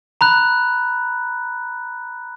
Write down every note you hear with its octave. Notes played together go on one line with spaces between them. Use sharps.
A#5 B5 F#6